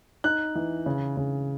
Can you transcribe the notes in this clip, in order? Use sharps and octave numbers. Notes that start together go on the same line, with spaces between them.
D#4 F#6
E3
C#3
C#3